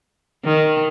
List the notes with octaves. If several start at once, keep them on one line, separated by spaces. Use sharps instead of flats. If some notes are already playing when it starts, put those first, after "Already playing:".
D#3